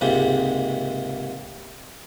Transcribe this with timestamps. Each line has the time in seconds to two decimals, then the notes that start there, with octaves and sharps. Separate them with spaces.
0.01 C#2 G#2 C3 A#3